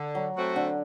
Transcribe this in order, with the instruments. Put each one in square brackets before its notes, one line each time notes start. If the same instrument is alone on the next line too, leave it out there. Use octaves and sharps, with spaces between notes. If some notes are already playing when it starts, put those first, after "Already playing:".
Already playing: [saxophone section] D3
[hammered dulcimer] F#3
[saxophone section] A3 C4 F#4
[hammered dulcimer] D3